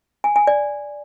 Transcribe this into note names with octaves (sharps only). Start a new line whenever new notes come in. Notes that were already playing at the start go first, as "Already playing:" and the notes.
G#5
G#5
D5